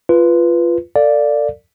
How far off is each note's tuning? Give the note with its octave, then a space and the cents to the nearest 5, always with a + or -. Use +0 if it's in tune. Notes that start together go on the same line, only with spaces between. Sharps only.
F4 -15 B4 +0
A4 +35 D5 +0 F5 +0